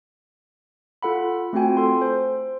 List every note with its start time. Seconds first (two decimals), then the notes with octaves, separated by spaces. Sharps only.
1.03 F4 A4 F#5 B5
1.53 A3 C4 F4 F#4 G5 G#5
1.77 A4 C6
2.02 C5